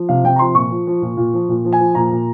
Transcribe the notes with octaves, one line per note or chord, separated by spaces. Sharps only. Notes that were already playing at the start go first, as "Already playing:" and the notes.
Already playing: F3
C3 F5
C3 G5
A#5
F3 C6
A#2 C#6
F3
F3
A#2
A#2
F3
A#2
F3
G#5
F3
A#2 A#5
A#2